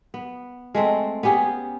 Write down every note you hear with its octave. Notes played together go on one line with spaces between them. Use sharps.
B3
G#3 A3 C4
B3 C#4 G4 G#4